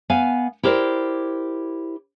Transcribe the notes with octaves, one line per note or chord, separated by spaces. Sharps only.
B3 F5 G#5
E4 G4 A#4 C5 D5